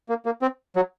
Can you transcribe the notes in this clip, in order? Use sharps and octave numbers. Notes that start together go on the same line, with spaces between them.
A#3
A#3
C4
F#3